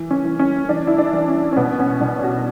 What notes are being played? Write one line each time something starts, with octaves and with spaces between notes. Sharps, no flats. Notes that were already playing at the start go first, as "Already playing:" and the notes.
Already playing: E3
C#4
E3
C#4
E3 D4
E4
D4
E3
C#4
C#4
B2 B3
C#4
B2 D4
F#4